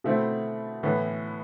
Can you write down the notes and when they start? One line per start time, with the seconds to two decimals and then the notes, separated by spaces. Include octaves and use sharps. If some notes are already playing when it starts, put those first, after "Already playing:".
0.04 B2 A3 C4 E4
0.83 A2 E3 B3